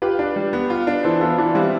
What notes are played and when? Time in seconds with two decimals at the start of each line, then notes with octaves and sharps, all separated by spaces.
0.02 F4 G4 B4
0.19 D4
0.36 G3
0.53 B3
0.70 F4
0.87 D4
1.03 E3 A4 C5
1.20 B3 F4 A4
1.37 E3 D4 F4
1.55 G3 C4 E4